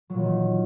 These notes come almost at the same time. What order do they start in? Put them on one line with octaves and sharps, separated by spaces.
F#3 A#2 E3 D#3